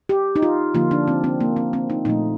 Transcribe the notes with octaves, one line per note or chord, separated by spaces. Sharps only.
G4
D#4
F4
D3 F3 A#3 F4
D4
C4
C4
A#3
C4
C4
D#4
A#2 F3 A3 D#4